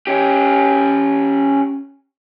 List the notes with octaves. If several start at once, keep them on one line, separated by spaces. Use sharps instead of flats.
C#4 G4